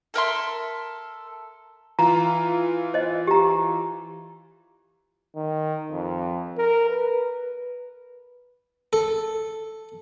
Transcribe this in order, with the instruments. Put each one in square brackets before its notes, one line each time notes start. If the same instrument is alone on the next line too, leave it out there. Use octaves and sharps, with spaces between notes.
[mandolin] A4 A#4 E5 C6
[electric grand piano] E3 F4 [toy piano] A#5
[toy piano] C5 D#5
G4 A#5
[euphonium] D#3
F2
A#4
B4
[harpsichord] A4